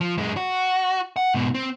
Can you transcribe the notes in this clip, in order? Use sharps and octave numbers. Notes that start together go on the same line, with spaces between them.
F3
F#2 G#3
F#4
F#5
G#2 B2
C4